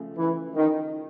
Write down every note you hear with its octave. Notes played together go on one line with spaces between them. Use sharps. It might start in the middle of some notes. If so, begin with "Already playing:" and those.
Already playing: C#3 F3 A3
E3
D#3